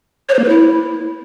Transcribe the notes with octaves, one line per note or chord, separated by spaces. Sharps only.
C#5
C5
A#3
B4
E4